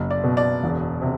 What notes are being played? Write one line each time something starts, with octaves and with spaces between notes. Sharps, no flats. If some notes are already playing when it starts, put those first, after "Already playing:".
Already playing: F#1 F#3
D5
B2
D5
E1
C3